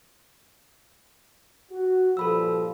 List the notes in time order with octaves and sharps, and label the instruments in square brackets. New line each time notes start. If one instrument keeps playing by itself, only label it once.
[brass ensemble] F#4
[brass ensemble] G2 A#2 F3 [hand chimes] A4 B5 E6